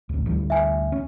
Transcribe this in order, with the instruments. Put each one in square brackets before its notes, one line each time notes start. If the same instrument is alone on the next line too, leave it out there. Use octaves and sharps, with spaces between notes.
[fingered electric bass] A1 D2
D2 E3 G3
[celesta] E5 G#5
[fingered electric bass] C#4